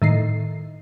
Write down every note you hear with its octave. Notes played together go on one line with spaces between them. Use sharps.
A2 D#3 C7